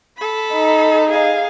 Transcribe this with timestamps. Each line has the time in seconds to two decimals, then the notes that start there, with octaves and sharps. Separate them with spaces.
0.17 A4 B5
0.54 D#4
1.10 G#4 F5